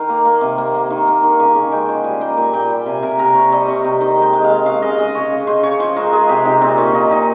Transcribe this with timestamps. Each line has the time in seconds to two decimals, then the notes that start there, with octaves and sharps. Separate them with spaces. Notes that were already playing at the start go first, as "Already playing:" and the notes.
Already playing: D#3 F5 G5
0.09 A#3
0.25 A#3
0.41 C3
0.58 A#3
0.75 A#3
0.90 D#3
1.07 A#3
1.23 D#3
1.40 C#3 G#5
1.56 C#3
1.72 G#3 G5
1.89 F3
2.04 G3 G#5
2.21 A#3 G5
2.37 A#2 G#5
2.53 A#2 G5
2.70 G3
2.86 C3 G#5
3.02 C3 A#4
3.19 C3 A#4
3.35 C3 C#5
3.52 G3 D#5
3.68 C3 C#5
3.84 C3 G5
4.00 D#3 D#5
4.17 G#3
4.22 G5
4.33 G#3
4.44 F5
4.50 G#3
4.66 C#3 F5
4.82 C#3 D#5
4.98 G#3 D#5
5.15 C#3 C#5
5.32 C#3
5.47 C#3 C5
5.63 C#3 C#5
5.80 F3 C5
5.96 G#3 A#4
6.13 G#3 G#4
6.29 C3 G4
6.45 C3 D#4
6.61 A#2 C4
6.78 A#2 C#4
6.94 F3 D#4
7.11 A#2 D#4